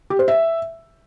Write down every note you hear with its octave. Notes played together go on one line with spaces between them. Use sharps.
G4
C5
E5